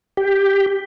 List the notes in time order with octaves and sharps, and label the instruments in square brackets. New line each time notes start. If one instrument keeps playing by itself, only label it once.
[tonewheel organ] G4